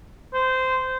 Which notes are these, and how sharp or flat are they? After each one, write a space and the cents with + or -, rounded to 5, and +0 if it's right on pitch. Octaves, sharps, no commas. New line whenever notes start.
C5 -15